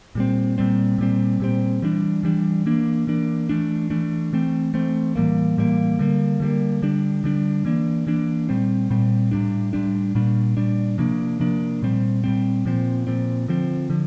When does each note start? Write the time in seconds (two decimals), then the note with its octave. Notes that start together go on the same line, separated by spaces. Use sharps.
0.15 A#2 G3 C4
0.58 A#2 G3 C4
0.98 A#2 G3 C4
1.40 A#2 G3 C4
1.82 E3 G3 D4
2.23 E3 G3 D4
2.66 E3 A#3 D4
3.07 E3 A#3 D4
3.49 E3 A3 D4
3.90 E3 A3 D4
4.33 E3 A3 C4
4.74 E3 A3 C4
5.16 A2 E3 G3 A#3
5.58 A2 E3 G3 A#3
5.99 D3 G3 A#3
6.40 D3 G3 A#3
6.82 D3 G3 D4
7.24 D3 G3 D4
7.65 E3 A#3 D4
8.07 E3 A#3 D4
8.49 A#2 G3 C4
8.90 A#2 G3 C4
9.31 A2 G3 D4
9.73 A2 G3 D4
10.15 A#2 G3 D4
10.57 A#2 G3 D4
10.98 C3 F3 A#3 D4
11.40 C3 F3 A#3 D4
11.82 A#2 G3 C4
12.24 A#2 G3 C4
12.66 A#2 F3 C4
13.07 A#2 F3 C4
13.48 D3 F3 C4
13.90 D3 F3